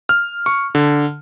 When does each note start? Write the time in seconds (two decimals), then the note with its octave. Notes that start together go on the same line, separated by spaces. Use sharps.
0.09 F6
0.46 C#6
0.75 D3